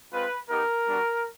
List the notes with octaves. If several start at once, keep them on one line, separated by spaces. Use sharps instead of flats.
G#3 C4 F4 B4
B3 D#4 G4 A#4
G3 B3 D4 F#4